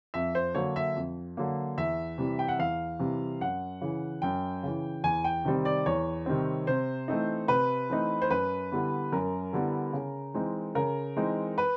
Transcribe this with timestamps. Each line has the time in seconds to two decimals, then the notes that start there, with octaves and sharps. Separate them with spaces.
0.14 F2 E5
0.35 C5
0.55 D3 F#3 A#3 C#5
0.76 E5
0.96 F2
1.37 D3 F#3 A#3
1.78 E2 E5
2.18 C3 E3 G3
2.39 G5
2.48 F#5
2.59 E2 F5
3.00 C3 E3 G3
3.41 F#2 F#5
3.81 C#3 E3
4.22 F#2 G5
4.63 C#3 E3
5.04 E2 G#5
5.24 G5
5.45 C3 D#3 G3 C4
5.65 D5
5.86 E2 C#5
6.26 C3 D#3 G3 C4
6.67 C3 C5
7.08 E3 A3 C4 D#4
7.48 C3 B4
7.89 E3 A3 C4 D#4
8.22 C5
8.30 F#2 B4
8.72 D3 G3 B3 E4
9.12 F#2 A#4
9.53 D3 G3 B3 E4
9.93 C#3
10.34 E3 G#3 C4 D#4
10.75 C#3 A#4
11.17 E3 G#3 C4 D#4
11.58 B4